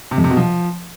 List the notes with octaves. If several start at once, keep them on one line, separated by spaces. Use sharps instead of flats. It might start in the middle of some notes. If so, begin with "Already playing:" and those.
C3
F2
C3
B2
F3